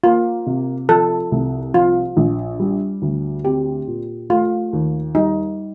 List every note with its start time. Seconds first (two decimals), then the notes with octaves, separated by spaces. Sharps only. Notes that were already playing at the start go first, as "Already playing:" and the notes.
0.04 A#3 F4
0.46 C3
0.89 F3 A4
1.32 C2
1.74 F3 F4
2.17 A#1
2.60 G3
3.02 D2
3.45 C4 G4
3.87 A#2
4.30 A3 F4
4.73 D#2
5.15 G3 D#4